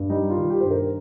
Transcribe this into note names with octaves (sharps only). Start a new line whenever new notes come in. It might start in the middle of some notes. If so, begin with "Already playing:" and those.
Already playing: G2
G3 D#4
F4
D#3
G4
G2 C5
A#4